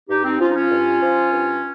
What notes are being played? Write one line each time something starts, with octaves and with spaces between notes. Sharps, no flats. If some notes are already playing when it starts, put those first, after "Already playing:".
G2 D#4 G4
C4 D#4
F3 C#4 F4
D#4
C#4 F4
G2
F3
G2